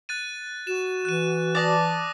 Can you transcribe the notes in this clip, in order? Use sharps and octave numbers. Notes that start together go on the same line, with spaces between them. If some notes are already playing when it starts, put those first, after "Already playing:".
F#6 A6 D#7
F#4 E7
E3 F#6 D#7
D5 A5 D6 D#6 A#6